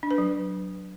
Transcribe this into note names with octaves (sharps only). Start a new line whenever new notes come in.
D4
B4
F#3